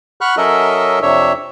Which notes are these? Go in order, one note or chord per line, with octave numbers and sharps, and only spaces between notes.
F#5 B5 C#6 F6 F#6
F#3 C#4 A4 A#4 D#5 E5
F2 C3 D4 C#5 E5